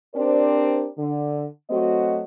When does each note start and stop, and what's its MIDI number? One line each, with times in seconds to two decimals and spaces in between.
0.15 0.88 60
0.15 0.88 62
0.15 0.88 67
0.15 0.88 70
0.15 0.88 72
0.15 0.88 74
0.98 1.45 50
1.70 2.24 54
1.70 2.24 57
1.70 2.24 60
1.70 2.24 66
1.70 2.24 75